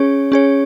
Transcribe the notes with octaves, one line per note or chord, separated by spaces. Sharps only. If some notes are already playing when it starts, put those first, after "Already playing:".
Already playing: C#4 G#4 C#5
C#4 G#4 C#5